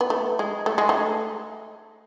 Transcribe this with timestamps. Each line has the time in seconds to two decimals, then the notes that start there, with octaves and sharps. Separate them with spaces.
0.01 B3
0.10 A3
0.39 G#3
0.66 A3
0.78 G#3
0.89 A3